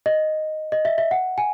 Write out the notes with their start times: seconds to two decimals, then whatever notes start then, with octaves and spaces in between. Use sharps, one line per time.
0.06 D#5
0.72 D#5
0.85 E5
0.98 E5
1.11 F#5
1.38 G#5